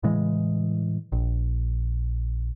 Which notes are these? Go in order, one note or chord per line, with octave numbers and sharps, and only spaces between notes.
A2 C#3 E3 G#3
A#1